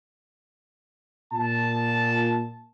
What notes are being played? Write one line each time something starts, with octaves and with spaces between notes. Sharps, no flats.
A#2 A5